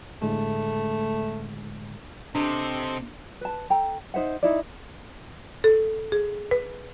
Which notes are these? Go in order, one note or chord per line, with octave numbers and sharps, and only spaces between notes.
A2 D3 G#3 A3
C3 D4 A4 C5 D#5
B4 A5
A4 G5 A#5
D#4 C5 E5 F#5
D#4 E4 D5
A4
G#4
B4